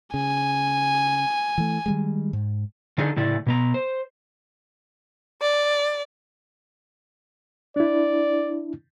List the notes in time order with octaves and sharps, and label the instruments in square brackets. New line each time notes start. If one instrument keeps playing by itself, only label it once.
[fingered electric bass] C#3 [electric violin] G#5
[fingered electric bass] E3 A3
D#3 G3 G#3
G#2
[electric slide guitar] D3 D4 D#4 G#4 A4
A2 C#3 E4 D5
B2 B3 A#5
C5
[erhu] D5
[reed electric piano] D4 E4 [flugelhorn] D5